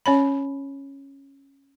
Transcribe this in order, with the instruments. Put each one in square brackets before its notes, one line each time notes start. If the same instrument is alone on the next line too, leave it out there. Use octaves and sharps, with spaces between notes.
[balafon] C#4 C#5 B5